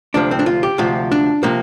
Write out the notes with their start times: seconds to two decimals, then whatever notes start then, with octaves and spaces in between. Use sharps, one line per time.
0.14 D2 C3 F3 D4
0.31 C4
0.39 D4
0.46 F4
0.63 G4
0.78 D2 C3 F3 F4
1.11 D4
1.43 C3 F3 A#3